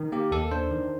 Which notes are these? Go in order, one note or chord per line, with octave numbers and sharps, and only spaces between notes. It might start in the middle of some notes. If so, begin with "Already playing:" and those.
Already playing: D#3
A#3 G4
D#2 A4
D4 C5
D#3